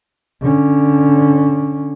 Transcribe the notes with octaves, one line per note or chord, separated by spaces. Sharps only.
D3 C#4